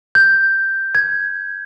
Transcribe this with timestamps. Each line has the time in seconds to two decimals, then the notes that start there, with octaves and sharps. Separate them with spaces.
0.15 G6
0.95 G#6